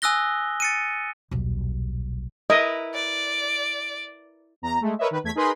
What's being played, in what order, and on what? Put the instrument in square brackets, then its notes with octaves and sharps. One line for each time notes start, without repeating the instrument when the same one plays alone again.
[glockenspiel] G#5 D#6 E6 F#6 A#6 G7
A6 C#7 D#7
[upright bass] D#1 B1
[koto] E4 A#4 B4 [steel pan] D#5
[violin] D5
[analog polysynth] E2 A#5
G#3 A3
A#4 B4 C#5 D#5 E5
D#3 B4
E2 A3 G#6 B6
D#4 G#4 A#4 B4 B5 C6